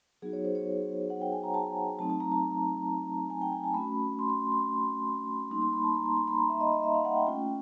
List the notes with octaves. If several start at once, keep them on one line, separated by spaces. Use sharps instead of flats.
F#3 B3 D#4 F#4 G#4
C#5
C5
C#5
F#5
G5
G#5
A#5
A5
F#3 A3 C4 D#4 A5
A5
A#5
A5
G#5
G5
G#5
A5
A3 C#4 F#4 B5
C6
C6
C6
G3 A#3 D#4 C6
C6
B5
A5
A#5
C6
C6
B5
A#5
E5
D#5
D#5
E5
F5
F#5
G5
A3 C#4 F4 G5